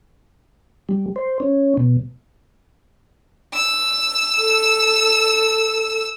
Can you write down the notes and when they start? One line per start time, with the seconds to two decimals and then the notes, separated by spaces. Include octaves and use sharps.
0.89 G3
1.16 C5
1.40 C#4
1.77 B2
3.53 E6
4.37 A4